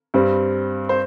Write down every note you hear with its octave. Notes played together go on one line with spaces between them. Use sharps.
G2 G3 C4
C5